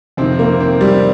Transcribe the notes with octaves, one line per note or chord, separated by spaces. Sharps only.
F2 C3 D#3 C4
A#3
C4
G3